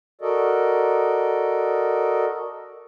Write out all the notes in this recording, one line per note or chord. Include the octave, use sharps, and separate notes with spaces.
F#4 A4 A#4 D5 D#5